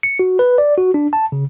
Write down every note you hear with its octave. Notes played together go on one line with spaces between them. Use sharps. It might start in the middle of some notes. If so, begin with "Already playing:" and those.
C#7
F#4
B4
D5
F#4
D4
A5
C#3